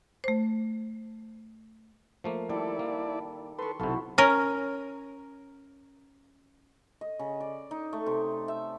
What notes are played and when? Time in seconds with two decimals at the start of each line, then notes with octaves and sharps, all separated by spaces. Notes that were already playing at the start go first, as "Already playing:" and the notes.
0.24 A3 C5
2.24 F3 A3 A#3
2.49 D#3 G3 E4 A4 D5
2.79 A#3
3.58 A4 B4 C6 C#6
3.80 B1 C3 E4 F#4 A4
4.18 C#4 A#4
7.01 D#5
7.19 C#3
7.40 D5
7.71 D#4
7.93 A3
8.06 C3
8.48 E5